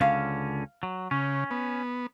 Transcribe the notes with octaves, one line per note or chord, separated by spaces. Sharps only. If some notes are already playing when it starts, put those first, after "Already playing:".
C#2 D3 C#4 F5
F#3
C#3 C#4
B3